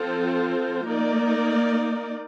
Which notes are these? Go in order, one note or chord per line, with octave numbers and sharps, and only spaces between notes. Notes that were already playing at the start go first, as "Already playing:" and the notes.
Already playing: F3 C4 F4 A4 C5
A#3 D#4 A#4 D5